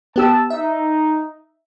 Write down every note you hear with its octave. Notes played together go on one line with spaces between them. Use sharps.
B3 G4 A5 E6
D#4 E5